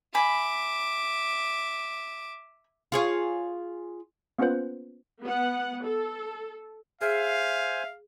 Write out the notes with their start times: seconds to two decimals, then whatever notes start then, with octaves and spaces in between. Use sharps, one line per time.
0.15 E5 G#5 B5 D6
2.92 F4 G#4 C#5
4.39 A#3 B3 C#4 F4 B4 C5
5.22 B3 F#5
5.84 A4
7.01 G#4 C5 E5 F5 G#5 F6